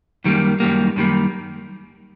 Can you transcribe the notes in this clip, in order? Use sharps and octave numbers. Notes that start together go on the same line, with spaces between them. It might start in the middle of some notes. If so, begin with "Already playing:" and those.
F#2 D#3 G3 A#3
F#2 D#3 G3 A#3
F#2 D#3 G3 A#3